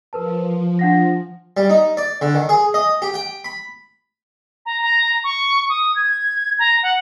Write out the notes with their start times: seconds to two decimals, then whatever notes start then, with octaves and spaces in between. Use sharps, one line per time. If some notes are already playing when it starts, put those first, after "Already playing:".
0.13 F3 A#4 B4 A5
0.79 D4 F#5 A#6
1.57 G3
1.69 D#4
1.97 D5
2.22 D3
2.35 D#3
2.49 G#4
2.74 D#5
3.02 G4
3.14 G5
3.44 B5
4.66 A#5
4.82 A#5
5.24 C#6
5.69 D#6
5.96 G#6
6.59 A#5
6.83 F#5